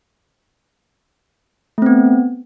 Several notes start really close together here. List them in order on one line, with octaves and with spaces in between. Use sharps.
A3 C4 B3